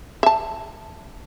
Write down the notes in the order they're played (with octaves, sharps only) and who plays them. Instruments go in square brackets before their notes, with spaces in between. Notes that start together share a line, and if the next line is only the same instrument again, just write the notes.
[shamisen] E5 A5